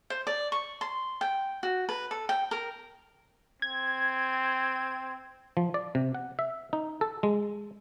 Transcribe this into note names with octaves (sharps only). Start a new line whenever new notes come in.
C5
D5
C#6
C6
G5
F#4
B4
A4
G5
A#4
C4 G#6
F3
D5
C3
F#5
E5
D#4
A4
G#3